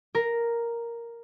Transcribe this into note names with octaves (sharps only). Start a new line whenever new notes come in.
A#4